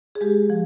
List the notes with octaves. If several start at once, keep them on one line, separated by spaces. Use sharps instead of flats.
G#4
G#3 G4
F3